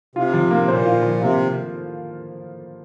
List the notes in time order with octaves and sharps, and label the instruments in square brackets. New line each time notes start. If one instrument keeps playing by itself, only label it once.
[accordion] C3 [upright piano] F4
[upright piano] F3
A#3
[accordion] A#2 [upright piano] C5
[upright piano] F4
F3
[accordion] C3 [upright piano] A#3